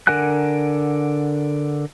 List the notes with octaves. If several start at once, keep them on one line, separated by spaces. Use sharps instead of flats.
D3 A#4 F#5 G#5 F#6